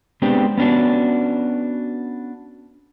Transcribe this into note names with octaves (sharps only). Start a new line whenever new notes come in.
G#3 B3 C4 D4 G4
B3 C#4 D4 F#4